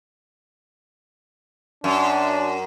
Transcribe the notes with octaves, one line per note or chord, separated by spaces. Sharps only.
F#2 D4